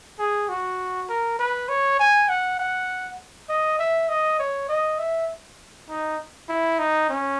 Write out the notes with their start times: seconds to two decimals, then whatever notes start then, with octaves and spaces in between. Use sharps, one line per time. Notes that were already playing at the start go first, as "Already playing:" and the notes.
0.19 G#4
0.49 F#4
1.09 A#4
1.39 B4
1.69 C#5
2.00 G#5
2.29 F#5
2.59 F#5
3.50 D#5
3.79 E5
4.09 D#5
4.39 C#5
4.69 D#5
4.99 E5
5.89 D#4
6.49 E4
6.79 D#4
7.10 C#4